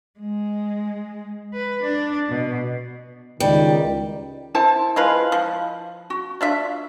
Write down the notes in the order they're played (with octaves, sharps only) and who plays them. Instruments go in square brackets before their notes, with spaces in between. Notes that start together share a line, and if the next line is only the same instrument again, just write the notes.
[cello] G#3
B4
D4
B2
[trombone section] C#2 D#3 [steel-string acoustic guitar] G3
[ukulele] E4 C5 A5
[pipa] G#3 F4 B4
F3
[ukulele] F#4
[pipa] D4 F4 E5